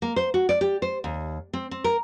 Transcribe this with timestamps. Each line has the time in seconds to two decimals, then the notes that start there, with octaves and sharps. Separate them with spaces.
0.02 A#3
0.16 C5
0.34 F#4
0.49 D5
0.61 G4
0.82 C5
1.04 D#2
1.53 C4
1.71 C4
1.84 A#4